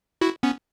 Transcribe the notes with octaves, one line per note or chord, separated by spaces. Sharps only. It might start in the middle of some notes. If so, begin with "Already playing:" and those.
E4 F#4
B3 C#4